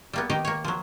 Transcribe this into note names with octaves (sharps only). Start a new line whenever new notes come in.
G3 A#3 B3
D#3 D#4 G4 A#5
A#3 C#5
F3 F#3